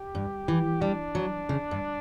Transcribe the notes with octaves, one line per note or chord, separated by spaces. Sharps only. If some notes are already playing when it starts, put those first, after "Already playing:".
Already playing: G4
G2
E3
G3 D4
F#3
C#3
G2